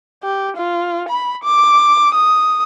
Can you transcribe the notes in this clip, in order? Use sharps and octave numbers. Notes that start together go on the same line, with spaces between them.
G4
F4
B5
D6
D#6